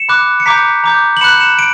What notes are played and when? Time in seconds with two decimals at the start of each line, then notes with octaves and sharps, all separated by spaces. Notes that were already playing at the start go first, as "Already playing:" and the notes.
Already playing: C#7 E7
0.09 B5 D6 F#6
0.40 C#7
0.46 A#5 D6 G6 B6 D7
0.84 A#5 D6 G6
1.17 F#7
1.21 B5 F#6 C#7 E7
1.40 C#7 E7
1.59 D7